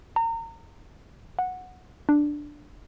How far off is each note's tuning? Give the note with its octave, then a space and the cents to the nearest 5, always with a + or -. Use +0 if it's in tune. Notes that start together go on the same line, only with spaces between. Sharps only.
A#5 -30
F#5 -10
D4 +5